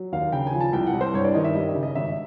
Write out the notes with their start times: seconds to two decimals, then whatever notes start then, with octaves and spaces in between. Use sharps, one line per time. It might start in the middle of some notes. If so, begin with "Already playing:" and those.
Already playing: F#3
0.12 D#2 F5
0.32 C#3 G5
0.47 G#5
0.54 F3
0.60 A5
0.73 C2 G5
0.87 F#5
0.94 C2
1.01 C5
1.14 G2 C#5
1.24 D5
1.35 D#3 D#5
1.44 E5
1.55 G3 D#5
1.69 E5
1.75 C#3
1.83 D#5
1.95 G#1 E5